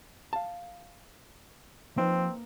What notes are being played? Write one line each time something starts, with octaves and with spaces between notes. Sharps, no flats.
F5 A5
F3 A#3 C4 D#4 B4